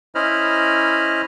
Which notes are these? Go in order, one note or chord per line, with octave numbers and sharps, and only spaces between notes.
C#4 E4 C5 D#5 B5 F6